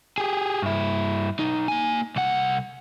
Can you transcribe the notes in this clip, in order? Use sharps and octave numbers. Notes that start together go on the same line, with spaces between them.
G4 G#4
G2 E4
B1 D#4
A#3 G#5
C2 F#5